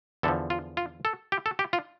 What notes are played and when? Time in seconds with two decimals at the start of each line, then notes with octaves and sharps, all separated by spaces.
0.23 E2 D3 F3 A4
0.50 F4
0.77 F4
1.05 A4
1.32 G4
1.46 A4
1.59 G4
1.73 F4